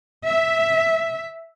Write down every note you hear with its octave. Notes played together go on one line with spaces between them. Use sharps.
E5